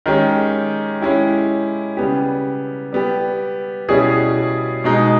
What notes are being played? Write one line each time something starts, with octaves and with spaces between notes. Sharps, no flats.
D#3 G#3 C#4 G4
G#3 C#4 E4 G4
C#3 G3 B3 G4
G3 B3 G4
B2 G3 C#4 E4 G#4
B2 G#3 D#4